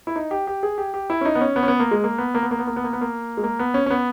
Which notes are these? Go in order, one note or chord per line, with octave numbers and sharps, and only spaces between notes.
E4
D#4
G4
G4
G#4
G4
G4
E4
C#4
D#4
B3
C#4
B3
C#4
B3
A#3
G#3
A#3
B3
A#3
B3
A#3
B3
A#3
B3
A#3
B3
A#3
G#3
A#3
B3
C#4
C#4
B3